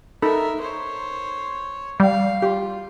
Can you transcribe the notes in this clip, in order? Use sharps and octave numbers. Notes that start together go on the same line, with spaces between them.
D#4 A4 A#4 E5 B5
C5 C#5
G3 F5
F4 G4